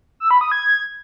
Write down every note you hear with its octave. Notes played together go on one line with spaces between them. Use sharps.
E6
B5
D#6
G#6